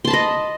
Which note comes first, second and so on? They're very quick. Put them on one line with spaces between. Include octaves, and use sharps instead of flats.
C6 A5 B5 D#5